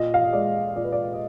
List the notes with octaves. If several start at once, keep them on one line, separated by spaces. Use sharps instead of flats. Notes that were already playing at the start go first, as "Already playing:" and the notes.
Already playing: A#2 D#5
F5
D#5
G#3 D5
A#2 D5
B4
D5
D#5